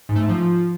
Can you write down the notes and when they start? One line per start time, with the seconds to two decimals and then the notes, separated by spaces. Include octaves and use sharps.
0.09 G#2
0.16 A3
0.22 G#2
0.29 F3